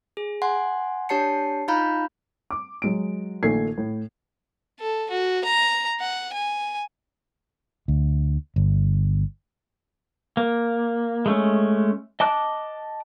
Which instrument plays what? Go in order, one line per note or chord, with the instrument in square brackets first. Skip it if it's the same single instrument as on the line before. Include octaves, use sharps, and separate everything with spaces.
[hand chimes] G#4
F#5 G#5 C6
D4 G4 C#5 A5 C7 C#7
D#4 F4 F5 A#5 B5 G6
[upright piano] D6
F#3 G#3 D7
A#1 D#3 A3 G#6 C7
A2
[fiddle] A4
F#4
A#5
F#5
G#5
[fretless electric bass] D2
G1
[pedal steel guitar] A#3
G#3 A3 C#4
D#5 A5 D6 F#6